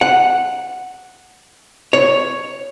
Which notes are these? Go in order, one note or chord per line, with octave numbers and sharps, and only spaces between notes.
F#5
C#5